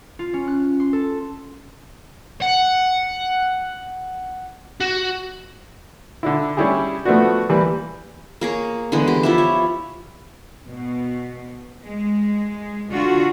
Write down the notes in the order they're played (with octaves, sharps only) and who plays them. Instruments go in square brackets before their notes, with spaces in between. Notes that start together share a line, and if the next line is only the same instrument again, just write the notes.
[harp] F4
C#4
F#6
C6
A4
[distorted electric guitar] F#5
F#4
[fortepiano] D3 D4 E4
G3 C#4 D4 E4 G4 G#4
F3 A3 B3 D4 F#4
E3 G3 A#3 B4
[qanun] A#3 G#4 C#5
D3 E3 G#3 B3
G4
F3 E4 E5
C#5
[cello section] B2
G#3
D3 F4 F#4